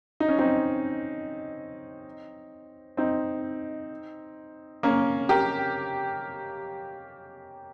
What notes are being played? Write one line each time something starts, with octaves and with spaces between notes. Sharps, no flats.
D#4
C#4
C4 D#4
C4 D#4
A#3 C#4
G4 A#4